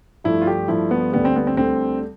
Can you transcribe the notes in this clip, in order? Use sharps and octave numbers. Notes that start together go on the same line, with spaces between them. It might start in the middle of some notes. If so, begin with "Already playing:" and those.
G2 F3 A3 E4
F4
G4
G2 F3 A3 E4
B3
D2 D3 G3 B3
C4
B3
C4
D2 D3 G3 C4